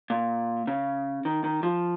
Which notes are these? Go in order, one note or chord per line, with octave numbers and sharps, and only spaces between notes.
A#2
C#3
D#3
D#3
F3